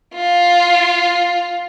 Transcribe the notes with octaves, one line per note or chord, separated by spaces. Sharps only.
F4